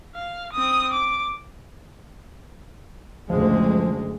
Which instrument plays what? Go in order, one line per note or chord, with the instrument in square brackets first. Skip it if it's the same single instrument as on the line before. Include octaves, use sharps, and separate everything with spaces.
[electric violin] F5
C4 D#6
D6
[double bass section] F#1 D2 G#3 [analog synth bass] F3